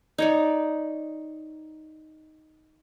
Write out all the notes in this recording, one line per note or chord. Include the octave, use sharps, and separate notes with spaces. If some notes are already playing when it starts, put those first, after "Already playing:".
D#4 C#5 D5